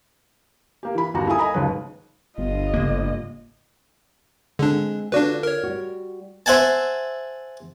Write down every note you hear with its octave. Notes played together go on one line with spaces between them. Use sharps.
A#3 G4
E3 B5
G1 D#2 G3 F#4 G4 A#5
A#3 E4 A4 G#5 D#6
D#5 G#5 A#5 B5
G#1 D#2 C#3 F#3 B4
G1 F4 D#5
G#2 C#3 A#3
D3 G#3 C4 D4
D3 D4 F4 F#4 B4 D5
A#4 C#5
G3 F#4
C5 E5 F#5 G#5 A5